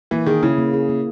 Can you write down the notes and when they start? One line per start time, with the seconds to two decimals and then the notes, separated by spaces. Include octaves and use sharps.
0.11 E3 A#3
0.26 D#3 G#4
0.43 C#3 E4
0.58 A#3
0.74 G#4
0.89 A#3